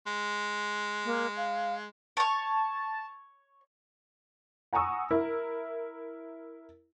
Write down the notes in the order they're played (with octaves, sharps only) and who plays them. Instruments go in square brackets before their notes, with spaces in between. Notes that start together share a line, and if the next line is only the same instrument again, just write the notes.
[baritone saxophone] G#3
[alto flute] A#3
F5
[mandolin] C#5 C#6 [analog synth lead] A5
[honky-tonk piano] F#5 G#5 A#5 C#6 D#6 E6
E4 A#4